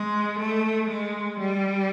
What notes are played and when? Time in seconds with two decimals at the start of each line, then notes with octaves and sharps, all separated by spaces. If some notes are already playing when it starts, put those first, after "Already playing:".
Already playing: G#3
0.39 A3
0.90 G#3
1.40 G3